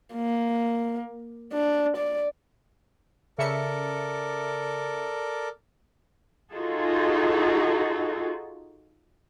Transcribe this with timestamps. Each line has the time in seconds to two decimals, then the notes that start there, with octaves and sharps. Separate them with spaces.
0.14 A#3
1.53 D4
1.97 D5
3.38 C#3 A4 A#4 D5 E5 C#7
6.53 D#4 F4 F#4 G#4 A4